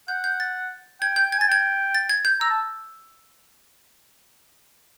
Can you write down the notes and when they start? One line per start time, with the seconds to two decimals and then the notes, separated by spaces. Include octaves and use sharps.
0.08 F#5 G6
0.24 G6
0.40 A6
1.01 G5 G#6
1.16 G6
1.32 G#6
1.38 G#5 A6
1.48 G5 G#6
1.95 A6
2.10 G#6
2.25 G6
2.40 A#5 E6
2.50 A5